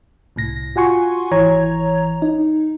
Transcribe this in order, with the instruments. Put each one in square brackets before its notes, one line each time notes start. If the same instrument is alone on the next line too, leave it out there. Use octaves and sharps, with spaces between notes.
[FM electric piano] C2 A2 A#6
F4 F#4 F#5 G#5 C6 C#6
G#1 E3 C#5 A#5 G#6
D#4